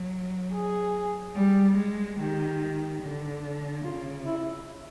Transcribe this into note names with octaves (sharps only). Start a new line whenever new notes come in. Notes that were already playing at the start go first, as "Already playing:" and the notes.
Already playing: F#3
G#4
G3
G#3
D#3 G4
D3
C#3 F4
E4